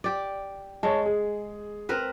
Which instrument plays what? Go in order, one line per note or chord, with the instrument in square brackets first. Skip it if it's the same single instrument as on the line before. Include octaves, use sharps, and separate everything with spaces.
[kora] G4 D5
[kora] G#3 [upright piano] C#5 A5
[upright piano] G#4
[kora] C4 A#4 B4